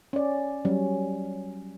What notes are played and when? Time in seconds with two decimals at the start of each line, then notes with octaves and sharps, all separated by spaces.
0.13 C#4 D5
0.65 F#3 G3 C#4